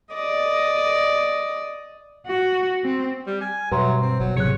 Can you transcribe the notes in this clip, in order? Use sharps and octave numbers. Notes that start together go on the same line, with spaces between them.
D5 D#5
F#4
C4
G3
G#5 F6
G2 B2 F#3 B4 E5 A#5 C6
C4
G1 F#3
G1 G#2 C3 F#3 C#5 F#6 C#7